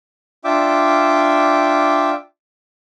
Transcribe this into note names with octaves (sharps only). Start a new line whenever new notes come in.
D4 F4 E5 G5 D6